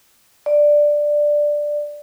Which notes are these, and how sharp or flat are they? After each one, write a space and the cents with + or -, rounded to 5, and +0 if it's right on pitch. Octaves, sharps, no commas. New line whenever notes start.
D5 +5